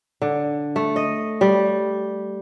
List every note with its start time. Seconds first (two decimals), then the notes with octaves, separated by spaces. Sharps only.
0.22 D3
0.76 A3
0.96 D#5
1.41 G3